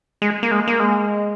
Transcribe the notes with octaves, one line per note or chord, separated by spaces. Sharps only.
G#3
A#3
G#3
A#3
G#3